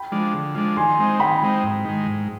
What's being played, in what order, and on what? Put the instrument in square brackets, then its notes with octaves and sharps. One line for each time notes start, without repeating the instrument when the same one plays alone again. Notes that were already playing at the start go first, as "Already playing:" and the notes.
Already playing: [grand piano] G5 B5
[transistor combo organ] F3 G#3 D4
D3
F3 G#3 D4
[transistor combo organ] D#3 [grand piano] G#5 C6
[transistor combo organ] G#3 C4 D#4
[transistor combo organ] D#3 [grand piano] G5 B5
[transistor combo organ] G#3 C4 D#4
G#2
D#3 G#3
G#2